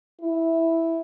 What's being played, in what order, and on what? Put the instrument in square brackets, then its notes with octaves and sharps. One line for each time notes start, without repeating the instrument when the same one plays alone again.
[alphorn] E4